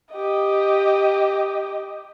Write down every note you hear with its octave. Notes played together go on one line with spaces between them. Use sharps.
G4 D#5